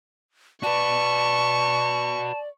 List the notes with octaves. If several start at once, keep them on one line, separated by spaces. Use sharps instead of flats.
F#4 B4 D5 A5 C#6